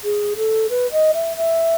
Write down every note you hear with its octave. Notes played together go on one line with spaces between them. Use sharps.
G#4
A4
B4
D#5
E5
E5